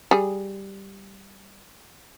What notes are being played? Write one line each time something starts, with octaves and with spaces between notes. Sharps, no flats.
G3 G#4